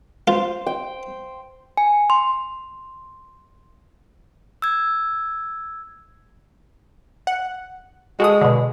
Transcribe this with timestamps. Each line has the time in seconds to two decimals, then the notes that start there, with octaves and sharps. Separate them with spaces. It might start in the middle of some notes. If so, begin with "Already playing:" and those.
0.28 F4 C5
0.67 G5
1.77 G#5
2.10 C6
4.62 E6 G#6
7.27 F#5
8.20 G#3 F#4 A4 D#6
8.41 B2 D3